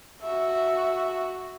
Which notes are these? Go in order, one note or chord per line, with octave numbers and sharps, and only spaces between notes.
F#4 E5